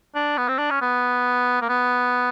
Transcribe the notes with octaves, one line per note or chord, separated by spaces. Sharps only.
D4
B3
C4
D4
C#4
B3
A#3
B3